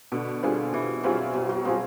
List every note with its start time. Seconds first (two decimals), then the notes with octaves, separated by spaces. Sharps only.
0.12 B2 D3
0.43 D3 G3 C4 F4 G#4
0.73 B2 E3
1.03 F#3 G3 C4 F4 G#4
1.33 B2 F#3
1.49 F#3
1.65 F3 G3 C4 F4 G#4